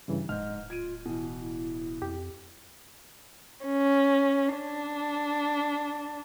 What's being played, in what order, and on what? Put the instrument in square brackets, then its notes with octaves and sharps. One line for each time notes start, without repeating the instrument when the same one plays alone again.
[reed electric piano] G2 C#3 E3
[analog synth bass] D1 [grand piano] G#2 G6 [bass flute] D#5 [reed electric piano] F6
[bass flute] F4 [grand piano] G#6 D7 D#7
[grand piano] B2 E3 [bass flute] E4
[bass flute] E4
[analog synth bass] F2 [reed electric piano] G4
[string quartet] C#4
D4